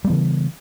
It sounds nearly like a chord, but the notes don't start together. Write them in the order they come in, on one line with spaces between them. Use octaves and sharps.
G3 B3 E3 C#3